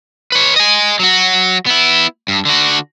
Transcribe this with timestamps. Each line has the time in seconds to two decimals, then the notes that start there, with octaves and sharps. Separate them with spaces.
0.32 B4 C#5
0.56 D#5 G#5
0.99 F#3 F#4
1.66 B3 E4
2.28 G2
2.45 D3 F#4